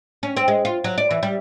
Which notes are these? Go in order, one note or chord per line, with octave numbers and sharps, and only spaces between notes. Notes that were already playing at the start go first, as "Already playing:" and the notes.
C#4
C4
G#3
F4
F#3
D5
E3
G3